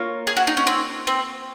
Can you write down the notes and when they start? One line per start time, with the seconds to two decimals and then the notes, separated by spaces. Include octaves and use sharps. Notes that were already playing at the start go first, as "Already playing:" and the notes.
Already playing: A#3 F4 A#4 C#5
0.27 G#4
0.37 F#4
0.47 D#4
0.57 C#4
0.67 C4
1.07 C4